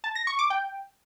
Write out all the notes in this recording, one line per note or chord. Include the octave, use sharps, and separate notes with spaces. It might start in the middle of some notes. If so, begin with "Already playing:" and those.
A5
A#6
C#6
D6
G5